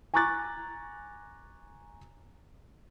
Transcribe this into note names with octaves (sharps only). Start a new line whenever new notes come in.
G#5 A#5 C#6 D6 F#6 A6